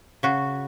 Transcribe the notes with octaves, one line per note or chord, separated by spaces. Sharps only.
C#3 F#4